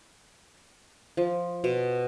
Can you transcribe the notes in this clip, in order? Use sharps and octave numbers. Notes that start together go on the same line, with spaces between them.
F3
B2